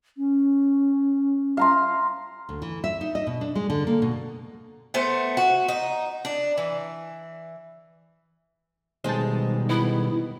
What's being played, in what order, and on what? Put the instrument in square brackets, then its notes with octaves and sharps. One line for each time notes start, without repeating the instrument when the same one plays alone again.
[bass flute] C#4
[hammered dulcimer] F5 A#5 C6
[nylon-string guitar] D2
E3
E5
D#4
D#5
B2
D4
G#3
D3
A#3
B2
[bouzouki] A3 B3 C5
F#4
D#4
D4
E3
[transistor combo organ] B2 D#3 G3 [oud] G#3 G#4 [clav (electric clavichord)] C5 A5
[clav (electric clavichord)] B3 [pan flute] E4